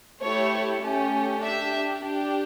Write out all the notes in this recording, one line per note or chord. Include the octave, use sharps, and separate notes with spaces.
A3 E4 G4 C#5
A3 C#4 G4
D4 G4 E5
D4 G4